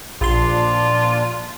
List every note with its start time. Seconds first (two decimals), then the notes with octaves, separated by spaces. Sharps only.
0.21 A#1 A#2 F3 D4 F4 C6